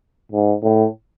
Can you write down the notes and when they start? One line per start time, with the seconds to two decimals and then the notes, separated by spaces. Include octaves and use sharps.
0.32 G#2
0.63 A2